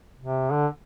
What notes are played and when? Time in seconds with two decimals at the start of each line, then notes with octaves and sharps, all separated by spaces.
0.20 C3
0.51 D3